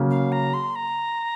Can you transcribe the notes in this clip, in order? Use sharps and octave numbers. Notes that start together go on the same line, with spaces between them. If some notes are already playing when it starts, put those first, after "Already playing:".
Already playing: C#3 F#3 A#3
F5
A#5
C6
A#5